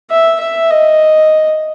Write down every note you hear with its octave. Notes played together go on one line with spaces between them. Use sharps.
E5
E5
D#5